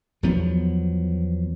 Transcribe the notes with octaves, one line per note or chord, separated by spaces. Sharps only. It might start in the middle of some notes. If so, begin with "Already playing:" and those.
E2 F3 F#3 B3